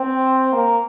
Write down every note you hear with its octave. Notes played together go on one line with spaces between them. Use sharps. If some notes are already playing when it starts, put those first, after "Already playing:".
Already playing: C4
A#3